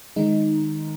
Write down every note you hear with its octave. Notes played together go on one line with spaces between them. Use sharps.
D#3 G#3 D#4